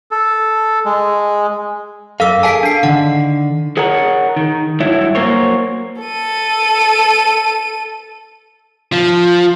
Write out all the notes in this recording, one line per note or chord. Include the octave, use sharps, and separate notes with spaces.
A4
G#3
F#2 A4 A#4 F5 E6
G#4 F5 G#5 A5 B6 D7
D4 C7
D3 D#3 F#5
G#4 A#4 C#5 F#5 A#5
D#3
G2 F#3 E4 C#5 E5
F#3 A#3 A#4 C5 C#5
A4 D#7
F3